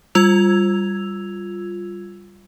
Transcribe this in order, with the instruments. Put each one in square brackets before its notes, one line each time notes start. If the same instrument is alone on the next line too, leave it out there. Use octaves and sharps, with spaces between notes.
[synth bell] G3 F4 E6 G#6 F7